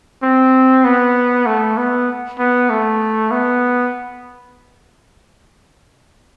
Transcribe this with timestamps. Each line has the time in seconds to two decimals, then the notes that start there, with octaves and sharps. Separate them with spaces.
0.23 C4
0.85 B3
1.46 A3
1.77 B3
2.39 B3
2.70 A3
3.31 B3